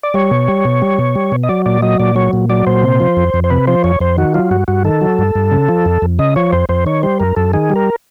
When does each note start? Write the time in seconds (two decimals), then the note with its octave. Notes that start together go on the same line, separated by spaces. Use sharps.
0.03 D5
0.14 G3 C#5
0.31 B2
0.48 G3
0.65 B2
0.82 G3
0.99 B2
1.15 G3
1.32 B2
1.43 D#5
1.49 F#3 D5
1.66 A#2 D5
1.82 F#3 D#5
2.00 A#2 D5
2.16 F#3 C#5
2.33 A#2
2.49 F#3 D5
2.67 A#2 C5
2.83 C3
3.00 F3
3.17 F2
3.34 F2
3.44 C5
3.50 C3 B4
3.67 F3 C5
3.84 F2 C#5
4.00 F2 C5
4.18 D#3 F#4
4.34 F#3 F4
4.51 G2 F#4
4.68 G2 F#4
4.85 D#3 A4
5.01 F#3
5.19 G2
5.35 G2
5.51 C#3
5.69 F3
5.86 F2
6.02 F2
6.19 C#3 D#5
6.36 F3 C#5
6.52 F2 C5
6.69 F2 C5
6.86 D#3 C#5
7.03 G3 C5
7.20 F#2 A#4
7.36 F#2 A4
7.53 D#3 G#4
7.70 G3
7.76 A#4